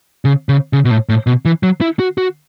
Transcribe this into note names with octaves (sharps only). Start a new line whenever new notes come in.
C#3
C#3
C#3
B2
A2
A2
B2
E3
F#3
E4
F#4
F#4